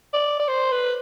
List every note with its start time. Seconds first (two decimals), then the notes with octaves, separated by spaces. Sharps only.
0.14 D5
0.39 D5
0.48 C5
0.72 B4